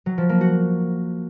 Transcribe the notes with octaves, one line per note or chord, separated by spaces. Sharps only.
F#3
F3
A#3
F#4